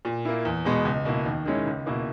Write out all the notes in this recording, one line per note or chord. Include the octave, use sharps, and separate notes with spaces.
A#2
A#3 E4
E2
B2 G#3 B3
C#2
B2 A#3 E4
D#2
D#3 G#3 C#4 E4
C#2
B2 A#3 E4